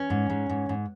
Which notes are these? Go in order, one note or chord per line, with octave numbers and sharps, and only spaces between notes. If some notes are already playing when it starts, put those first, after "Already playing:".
Already playing: C#4
G#2
G#2
G#2
G#2